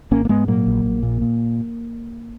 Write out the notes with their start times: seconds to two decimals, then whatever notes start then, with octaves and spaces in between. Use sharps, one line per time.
0.11 G#1 A#3 C#4
0.25 A#3
0.29 G#2 G#3 B3
0.48 A#2 F#3 A#3
0.67 A#1
0.85 A#1
1.03 A#2
1.21 A#2